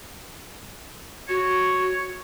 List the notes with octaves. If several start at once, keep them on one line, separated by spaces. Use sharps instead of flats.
F#4 C#5